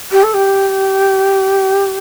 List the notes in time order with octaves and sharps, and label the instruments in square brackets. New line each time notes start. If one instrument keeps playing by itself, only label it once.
[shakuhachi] G4
A4
G4